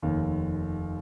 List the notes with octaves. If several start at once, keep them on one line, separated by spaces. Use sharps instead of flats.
F1 D#2 D#3